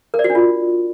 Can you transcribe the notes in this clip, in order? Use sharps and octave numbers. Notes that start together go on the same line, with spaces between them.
A#4
D5
F#4
D4
F4